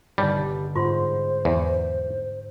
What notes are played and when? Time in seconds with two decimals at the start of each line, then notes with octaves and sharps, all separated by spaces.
0.18 G1 D3 G3 D#4 G4 C#5 D#5
0.76 G#2 F4 C5 C6
1.45 E2